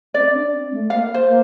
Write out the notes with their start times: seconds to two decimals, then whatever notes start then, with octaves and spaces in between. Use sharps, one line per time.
0.14 C4 D5
0.33 D4
0.52 C4
0.71 A3
0.89 A#3 F5
1.14 C5
1.27 A#3